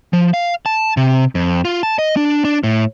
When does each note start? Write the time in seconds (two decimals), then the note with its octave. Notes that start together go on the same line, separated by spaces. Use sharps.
0.13 F3
0.34 F5
0.66 A5
0.97 C3
1.35 F2
1.65 F4
1.83 A5
1.99 D#5
2.17 D4
2.45 D4
2.64 A2